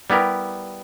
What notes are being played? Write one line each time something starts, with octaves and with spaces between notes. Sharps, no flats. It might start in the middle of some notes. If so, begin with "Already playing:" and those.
G3 B3 E4 G4 A#4